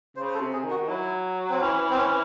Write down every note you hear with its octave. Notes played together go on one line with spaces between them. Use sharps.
C#3 C5
C5
A4
C3
G#4
D#3
F#4
F#3 E4
C4
E3 C#4
C4
C#4